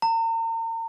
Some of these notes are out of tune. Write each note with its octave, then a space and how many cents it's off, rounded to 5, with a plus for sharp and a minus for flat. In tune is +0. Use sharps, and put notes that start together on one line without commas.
A#5 -40